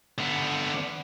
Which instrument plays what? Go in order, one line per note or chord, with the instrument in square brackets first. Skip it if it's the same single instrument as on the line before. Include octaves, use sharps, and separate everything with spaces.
[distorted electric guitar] D3 B3